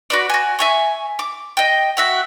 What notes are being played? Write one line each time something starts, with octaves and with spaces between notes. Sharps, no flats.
F#4 B4 D5
F#4 G#5
E5 G#5 C#6
D6
D#5 G5
F#4 E5 F#5